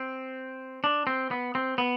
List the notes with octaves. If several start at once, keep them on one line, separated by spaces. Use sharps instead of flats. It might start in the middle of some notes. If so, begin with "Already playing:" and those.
Already playing: C4
D4
C4
B3
C4
B3